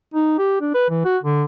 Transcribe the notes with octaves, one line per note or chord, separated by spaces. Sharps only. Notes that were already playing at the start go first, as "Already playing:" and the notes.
D#4
G4
D4
B4
E3
F#4
D3